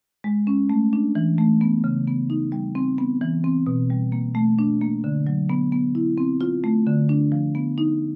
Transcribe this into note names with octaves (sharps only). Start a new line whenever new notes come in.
G#3
C#4
A3
D4
E3
A3
B3
C#3
B3
D#4
G3
C4
B3
E3
C4
B2
G3
A#3
A3
D4
A#3
D3
F#3
B3
B3
E4
C4
F4
A3
D3
D4
F3
B3
D#4